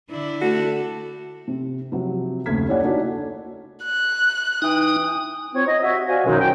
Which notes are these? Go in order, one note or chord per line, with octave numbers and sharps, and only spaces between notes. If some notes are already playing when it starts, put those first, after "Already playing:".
D3 D4 E4
A3 F#4 A4
C3
C3 F3 F#3
F#1 D#2 A3 G#6 B6
C#4 E4 G4 C#5 D5 F#5
A#3 D4 D#4 F#4 A4 D5
F#6
E3 D#4 G5 D#6
C4 F4 C#5
D#5
F#4 G4 E5
F#4 C5 D5 F5 G#5
F#2 B2 D#3 F#3 G#3 D#4
G5